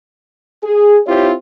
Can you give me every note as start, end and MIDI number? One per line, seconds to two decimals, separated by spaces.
0.64 0.98 68
1.06 1.32 60
1.06 1.32 64
1.06 1.32 65
1.06 1.32 67
1.06 1.32 72
1.06 1.32 73